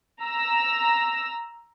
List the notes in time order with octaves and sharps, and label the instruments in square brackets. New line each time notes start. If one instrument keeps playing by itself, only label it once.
[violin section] A#5 E6